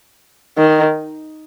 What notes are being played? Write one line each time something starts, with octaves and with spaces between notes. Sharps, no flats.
D#3